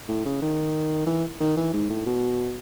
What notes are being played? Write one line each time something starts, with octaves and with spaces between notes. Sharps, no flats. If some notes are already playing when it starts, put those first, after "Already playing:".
A2
C#3
D#3
E3
D#3
E3
G#2
A2
B2